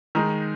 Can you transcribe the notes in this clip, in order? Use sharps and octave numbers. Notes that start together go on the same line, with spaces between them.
D#3 G#3 D#4